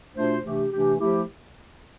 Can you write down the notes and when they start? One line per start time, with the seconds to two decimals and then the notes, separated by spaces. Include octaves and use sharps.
0.15 B2 A3 D4 F4 C5
0.44 C3 E3 A3 D4 G4
0.72 C3 E3 A3 D4 G4
1.00 F3 A3 E4 G4